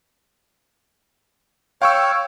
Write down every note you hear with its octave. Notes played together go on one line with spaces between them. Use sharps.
C#5 F5 G5 C#6 E6